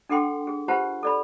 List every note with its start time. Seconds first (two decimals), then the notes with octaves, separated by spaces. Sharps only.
0.09 D4 A4 F#5 G5 C6 D6
0.47 G#4
0.68 F4 G4 B4 C5 F#5 A5
1.03 A4 D5 B5